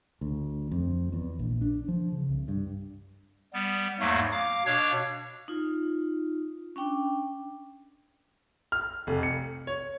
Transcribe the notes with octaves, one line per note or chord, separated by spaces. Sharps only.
D2
F2
E2
A#1
D4
F3
C#3
C2
G2
G3 B3
E2 G#2 F#3 A3 A#3
F5 D6
B2 D4 C#5 F5 D6 G#6
D#4 F4
C#4 D4 G5 D6
F6
F1
C#7
C#5